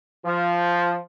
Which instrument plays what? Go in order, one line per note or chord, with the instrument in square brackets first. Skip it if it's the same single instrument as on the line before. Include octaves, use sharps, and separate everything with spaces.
[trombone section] F3